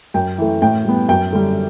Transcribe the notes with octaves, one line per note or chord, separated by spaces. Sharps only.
F#2 G5
E3 A3
A2 G5
G3 B3
F#2 G5
D3 G3